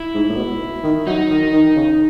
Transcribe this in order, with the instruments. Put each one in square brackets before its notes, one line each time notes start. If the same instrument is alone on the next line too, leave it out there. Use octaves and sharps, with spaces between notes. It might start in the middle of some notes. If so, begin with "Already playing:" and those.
Already playing: [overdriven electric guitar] E4
[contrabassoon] G#2
A2
B2
D#3
[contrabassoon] F#3 [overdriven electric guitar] D#4
[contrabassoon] D#3
D#3
C#3